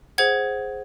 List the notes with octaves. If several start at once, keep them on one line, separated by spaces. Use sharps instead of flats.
G#4 C5 F#5 G#6